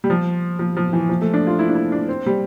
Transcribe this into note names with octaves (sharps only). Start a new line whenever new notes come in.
G3
F3
F3
F3
E3
F3
A3
D4
F4
E4
D4
E4
D4
C4
G3